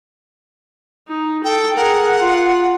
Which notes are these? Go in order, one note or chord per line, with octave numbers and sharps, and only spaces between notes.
D#4
A4 G5
G#4 A#4 F#5
F4